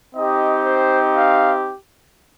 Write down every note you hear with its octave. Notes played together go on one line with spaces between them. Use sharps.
C4 D#4 G4 D#5
C5
F5